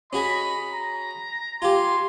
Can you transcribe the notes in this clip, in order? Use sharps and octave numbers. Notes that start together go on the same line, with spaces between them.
C#4 F#4 G#4 D#5 B5
A#5
F4 G4 G#5 C6